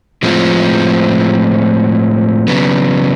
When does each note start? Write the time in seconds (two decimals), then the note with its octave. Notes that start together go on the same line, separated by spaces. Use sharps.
0.23 A2 F3 G#3 C4 F4
2.48 C#3 F#3 B3